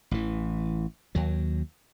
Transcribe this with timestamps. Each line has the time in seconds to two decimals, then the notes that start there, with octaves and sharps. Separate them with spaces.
0.11 A1 E3
1.15 D#2 F#3